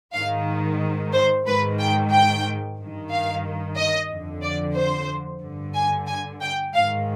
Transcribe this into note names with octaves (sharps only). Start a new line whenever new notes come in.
G#2 D#3 F5
C5
G#2 D#3 B4
G5
G5
G2 D#3
F5
D#5
F2 D3
D5
C5
G2 D3
G#5
G#5
G5
G#2 D#3 F5